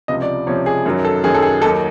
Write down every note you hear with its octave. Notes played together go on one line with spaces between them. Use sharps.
C#2 C3 F3 D#5
D5
C#2 C3 F3 C#5
G#4
F#2 D#3 F#3
A4
F#2 D#3 F#3 G#4
A4
G#4
D#2 D#3 F#3 A4